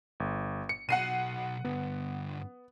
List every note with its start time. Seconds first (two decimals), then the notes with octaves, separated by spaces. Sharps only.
0.20 G1
0.69 C#7
0.89 B1 F#4 F#5 C7 D#7
1.64 G2 D3 B3